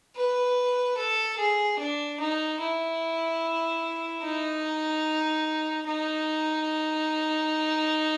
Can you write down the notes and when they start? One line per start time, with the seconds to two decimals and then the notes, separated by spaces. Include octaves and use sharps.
0.16 B4
0.97 A4
1.38 G#4
1.79 D4
2.20 D#4
2.60 E4
4.23 D#4
5.86 D#4